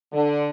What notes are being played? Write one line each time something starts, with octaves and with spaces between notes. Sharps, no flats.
D3